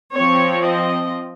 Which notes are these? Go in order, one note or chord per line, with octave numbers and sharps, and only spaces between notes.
C4 C#5
F3
D#5